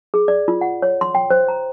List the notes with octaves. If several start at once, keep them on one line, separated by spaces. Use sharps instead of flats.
G#4
D5
F4
F#5
C#5
C6
G5
C5
A#5